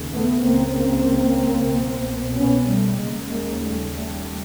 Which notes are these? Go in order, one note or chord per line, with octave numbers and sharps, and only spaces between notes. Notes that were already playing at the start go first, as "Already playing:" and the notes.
Already playing: D#2 C#3
A3 B3
C#2 C#3 A#3 C4
A#3 C4
C2 B2
B3 C#4
G3 A3
D#2 C#3 G#3 A#3
G#3 A#3
G3 A3
G3 A3